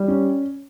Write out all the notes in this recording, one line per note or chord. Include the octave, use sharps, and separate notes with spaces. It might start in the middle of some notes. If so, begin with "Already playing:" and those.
Already playing: G3
C#4